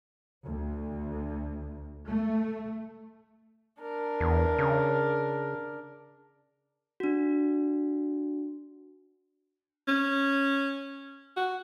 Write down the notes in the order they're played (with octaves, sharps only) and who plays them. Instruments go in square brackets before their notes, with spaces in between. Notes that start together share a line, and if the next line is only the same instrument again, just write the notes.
[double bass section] D2
A3
[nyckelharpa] D4 A#4
[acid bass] E2
C#3
[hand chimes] D4 F#4
[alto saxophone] C#4
F#4